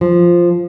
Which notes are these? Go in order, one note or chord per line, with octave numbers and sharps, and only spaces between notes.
F3